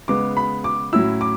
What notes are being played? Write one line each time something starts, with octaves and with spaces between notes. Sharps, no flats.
C#3 G#3 B3 D6
B5
D6
A2 F#3 C#4 E4 E6
D6